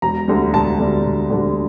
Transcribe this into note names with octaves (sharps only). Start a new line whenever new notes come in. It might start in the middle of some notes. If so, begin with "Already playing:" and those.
E1 A#5
D2 D3 G3 D4
E1 A5
D2 D3 G3 D4
E1
D2 D3 G3 D4